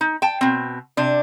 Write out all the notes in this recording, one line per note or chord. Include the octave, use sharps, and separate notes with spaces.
D#4
G5 A5
B2 C4
C3 D4